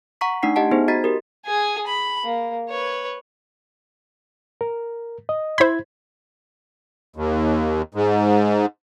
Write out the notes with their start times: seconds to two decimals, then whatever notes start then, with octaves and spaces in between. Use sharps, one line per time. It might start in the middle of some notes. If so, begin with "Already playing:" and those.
0.21 F#5 A#5 C#6 B6
0.43 A3 D4 D#4 F#5 C7
0.56 G4 D#5 F#5 A5
0.71 B3 D#4 G#4 C5
0.88 F#4 D#5 A#5 A6 B6
1.04 G4 A#4
1.45 G#4 G#5
1.86 B5
2.23 A#3
2.69 B4 C#5
4.61 A#4
5.29 D#5
5.58 E4 C5 B5 G#6
7.16 D#2
7.94 G#2